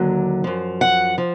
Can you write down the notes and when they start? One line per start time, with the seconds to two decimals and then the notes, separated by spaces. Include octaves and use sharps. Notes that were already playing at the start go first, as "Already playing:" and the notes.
Already playing: D#2 D3 F#3
0.44 F#2 F3
0.81 F#5
1.18 F3